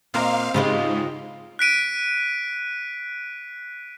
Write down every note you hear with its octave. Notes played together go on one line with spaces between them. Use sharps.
A#2 A#3 C4 C5 D#5 F5 A#5
G#2 C#3 G#3 F4 G4
F#6 B6 D7 D#7